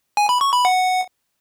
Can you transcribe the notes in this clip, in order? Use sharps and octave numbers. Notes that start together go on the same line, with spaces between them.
G#5
B5
C#6
B5
F#5